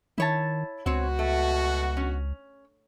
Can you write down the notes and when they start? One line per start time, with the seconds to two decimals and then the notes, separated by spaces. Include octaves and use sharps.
0.18 D#3 E4 C#5 A5
0.86 C#2 B2 C4 F#4 C#5
1.19 A3
1.97 C#4